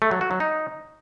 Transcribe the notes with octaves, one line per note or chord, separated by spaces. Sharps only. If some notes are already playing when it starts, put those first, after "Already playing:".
A3
F#3
F#4
F#3
D#4